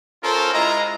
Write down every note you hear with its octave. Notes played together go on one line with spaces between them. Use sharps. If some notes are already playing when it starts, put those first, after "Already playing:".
C#4 F4 A4 A#4 C5
G#3 E4 F4 D#5 A#5